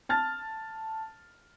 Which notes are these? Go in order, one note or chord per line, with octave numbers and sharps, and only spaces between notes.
A5 F6 A6